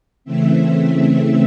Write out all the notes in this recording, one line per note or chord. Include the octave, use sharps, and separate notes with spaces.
C#3 E3 A3 C4 E5